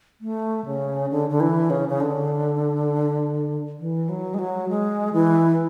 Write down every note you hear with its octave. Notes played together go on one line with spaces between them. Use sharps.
A3
C#3
D3
D3
E3
C#3
C#3
D3
E3
F#3
G#3
F#3
G#3
E3